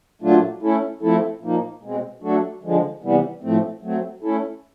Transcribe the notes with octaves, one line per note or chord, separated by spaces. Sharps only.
A#2 F#3 A3 D4 F4
A3 C#4 E4 A4
F3 A3 C4 E4 A4
A#2 F3 A#3 D#4
B2 G#3 C4
F#3 A3 D4 F#4 A4
D3 F3 G#3
C3 E3 G3 B3
A2 F3 A3 C4
F#3 A3 C4
A3 C#4 E4 A4